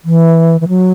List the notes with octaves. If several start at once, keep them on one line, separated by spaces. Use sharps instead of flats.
E3
E3
F#3